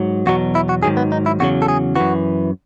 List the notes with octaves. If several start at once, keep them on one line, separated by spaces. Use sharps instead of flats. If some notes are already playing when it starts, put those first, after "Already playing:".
Already playing: G#2 F#3
E2 B2 F#3 F#4
E4
F#4
G#2 D#3 F#3 G#4
B3
D#4
E4
E2 C#3 F#3 F#4
A4
G#4
F#2 E3 F#4